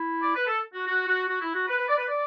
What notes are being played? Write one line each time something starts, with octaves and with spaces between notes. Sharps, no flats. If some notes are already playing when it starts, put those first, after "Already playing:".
Already playing: E4
D5
B4
A4
F#4
F#4
F#4
F#4
E4
F#4
B4
B4
D5
B4
D5